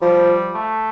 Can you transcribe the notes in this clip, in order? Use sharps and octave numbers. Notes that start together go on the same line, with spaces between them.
F3 G3
A3